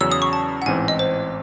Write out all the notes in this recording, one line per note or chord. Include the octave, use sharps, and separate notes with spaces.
E2 C#3 F#3 C#4 E6
D#6
C#6
A5
F#5
A1 G#2 E3 C4 G#5
D#5
C5